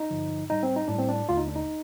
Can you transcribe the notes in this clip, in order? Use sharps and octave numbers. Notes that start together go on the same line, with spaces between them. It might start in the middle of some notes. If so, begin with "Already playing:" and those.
Already playing: D#4
G2 D3 F3
A2 G3 D#4
C4
D#4
A2 G3 D4
C4
D4
D#2 D3 A3 F4
D#4
D4
D#4